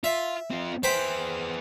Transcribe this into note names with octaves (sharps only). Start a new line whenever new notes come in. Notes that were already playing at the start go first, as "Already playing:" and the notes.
F4 E5
C4 F4
B3 G#4 C5 G5 B5